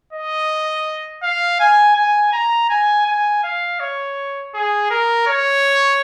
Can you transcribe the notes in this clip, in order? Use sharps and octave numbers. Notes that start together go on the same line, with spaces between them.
D#5
F5
G#5
G#5
A#5
G#5
G#5
F5
C#5
G#4
A#4
C#5